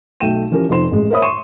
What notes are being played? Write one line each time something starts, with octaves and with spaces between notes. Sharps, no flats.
B1 A3 G5 D#7 E7
E3 F3 C#4 G4 A#4
F1 F3 D#4 C5 C6 E7
A1 G#3
A#4 C5 C#5 E5 B5 D#6
C6 C#6 D#7 E7